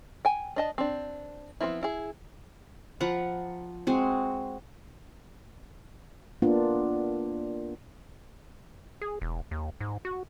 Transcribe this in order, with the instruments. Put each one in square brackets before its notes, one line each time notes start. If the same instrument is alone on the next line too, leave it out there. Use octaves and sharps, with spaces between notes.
[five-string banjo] G5 G#5
D4 D#5 A5
C4 D4
F3 B3 C4 E4
E4 G#4
[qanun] F3 F#5 A#5 B5
G#3 C4 F#4
[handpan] A#3 B3 D4 F4
[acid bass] G#4
E1
D#2
G#2
F#4